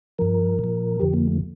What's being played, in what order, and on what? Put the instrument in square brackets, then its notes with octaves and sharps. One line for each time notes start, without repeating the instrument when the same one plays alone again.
[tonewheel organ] G2 F3 A#4
A#2 F3
F2 D3 F3 G4
A#3
A3